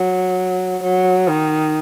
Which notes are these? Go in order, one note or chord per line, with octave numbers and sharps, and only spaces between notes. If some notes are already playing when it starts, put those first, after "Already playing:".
Already playing: F#3
F#3
D#3